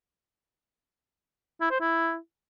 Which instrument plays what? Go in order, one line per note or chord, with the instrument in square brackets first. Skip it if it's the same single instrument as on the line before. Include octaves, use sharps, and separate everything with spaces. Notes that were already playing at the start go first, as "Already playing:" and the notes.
[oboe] E4
C5
E4